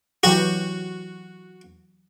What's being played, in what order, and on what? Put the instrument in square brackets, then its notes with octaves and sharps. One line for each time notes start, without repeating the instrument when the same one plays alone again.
[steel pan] E3 F#3 G4 [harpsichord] F#4